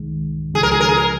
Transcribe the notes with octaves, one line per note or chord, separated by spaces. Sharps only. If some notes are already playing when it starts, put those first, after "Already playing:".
Already playing: C2 C3 D#3 G#3
C#2 C#3 F3 G#3 G#4
A#4
G#4
A#4
G#4
A#4